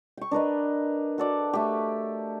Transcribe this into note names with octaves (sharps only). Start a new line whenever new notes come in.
G5 C#6
D4 A#4 B4 D#5
F#4 A4 D5
A3 G4